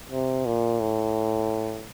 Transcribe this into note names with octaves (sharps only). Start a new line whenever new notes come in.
C3
A#2
A2